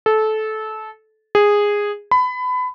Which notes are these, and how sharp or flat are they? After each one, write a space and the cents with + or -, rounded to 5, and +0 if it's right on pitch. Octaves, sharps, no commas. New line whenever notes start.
A4 -20
G#4 -10
B5 +25